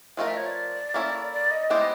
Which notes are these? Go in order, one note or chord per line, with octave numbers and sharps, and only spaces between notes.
F3 A3 C4 F4 A#4 D#5
E5
C#5
D5
A#3 C#4 E4 A4
D5
D#5
G#3 B3 E4 G4 C5